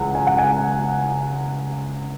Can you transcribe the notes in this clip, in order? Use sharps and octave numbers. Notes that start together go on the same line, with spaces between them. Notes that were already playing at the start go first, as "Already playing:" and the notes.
Already playing: C#2 C#3 E3 F#5
G#5
F#5
G#5